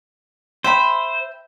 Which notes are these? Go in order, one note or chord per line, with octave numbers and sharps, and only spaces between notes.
C5 E5 G5 B5